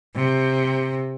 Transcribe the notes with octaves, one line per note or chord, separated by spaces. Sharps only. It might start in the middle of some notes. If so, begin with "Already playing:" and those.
C3